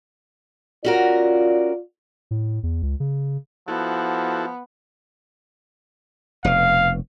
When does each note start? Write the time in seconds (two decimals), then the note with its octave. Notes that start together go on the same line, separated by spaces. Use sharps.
0.85 C#4 F4 F#4 A#4 D5
2.31 A2
2.63 E2
2.82 C#2
3.00 C#3
3.68 F3 B3 E4 F#4 A4
6.45 F1 B2 F5